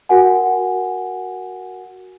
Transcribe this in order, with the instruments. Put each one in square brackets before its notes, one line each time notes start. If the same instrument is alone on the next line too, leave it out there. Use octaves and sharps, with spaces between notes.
[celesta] F#4 A#4 F#5 G#5